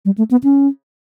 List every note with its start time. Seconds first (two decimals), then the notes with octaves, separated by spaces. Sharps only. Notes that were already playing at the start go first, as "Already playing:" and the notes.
0.05 G3
0.18 A3
0.31 B3
0.44 C#4